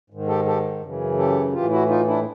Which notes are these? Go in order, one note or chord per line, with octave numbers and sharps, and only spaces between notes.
G#2 D#3
G4 A4
G4 A4
F#2 C#3 E3
G4 A4
A2 E3 F4 G4
E4 F#4
D#4 F4
D4 E4